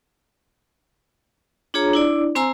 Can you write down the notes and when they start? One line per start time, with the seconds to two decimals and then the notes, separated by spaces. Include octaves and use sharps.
1.74 D4 F4 G#4 C#5 A#5
1.93 D4 E4 D5
2.35 C4 C5 G#5 A#5 C6 E6